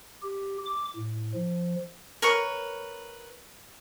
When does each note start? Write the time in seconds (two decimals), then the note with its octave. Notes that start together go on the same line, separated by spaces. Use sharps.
0.22 G4
0.66 D6
0.96 A2
1.34 F3
2.22 A#4 B4 C#5